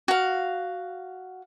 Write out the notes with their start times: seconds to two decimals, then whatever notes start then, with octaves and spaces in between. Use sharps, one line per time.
0.08 F#4 F5